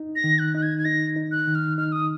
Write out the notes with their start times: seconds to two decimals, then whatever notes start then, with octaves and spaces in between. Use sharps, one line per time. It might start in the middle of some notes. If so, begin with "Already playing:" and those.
Already playing: D#4
0.16 A#6
0.24 D#3
0.39 F#6
0.54 D#4 F#6
0.62 G#6
0.78 G#6
0.85 D#4 A#6
1.16 D#4
1.32 F#6
1.47 D#3
1.55 F6
1.78 D#4 F6
1.92 D#6